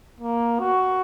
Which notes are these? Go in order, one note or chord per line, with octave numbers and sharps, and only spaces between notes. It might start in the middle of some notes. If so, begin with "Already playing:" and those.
A#3
F#4